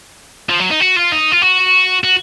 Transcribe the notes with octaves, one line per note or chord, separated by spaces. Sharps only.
F3
F#3
D#4
F#4
F4
D#4
F4
F#4
F#4